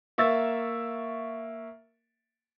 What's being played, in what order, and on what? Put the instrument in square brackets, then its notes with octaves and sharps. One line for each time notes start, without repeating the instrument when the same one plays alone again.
[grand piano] A#3 E5 C#6 E6 A6